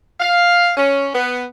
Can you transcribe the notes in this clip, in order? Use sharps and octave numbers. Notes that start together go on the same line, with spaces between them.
F5
C#4
B3